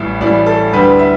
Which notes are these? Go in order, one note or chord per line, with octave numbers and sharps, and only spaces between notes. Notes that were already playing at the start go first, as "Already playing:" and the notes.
Already playing: A1 A2 E3 G3
A1 A2 E3 G3 D5
A4
D2 D3 G3 B4
E5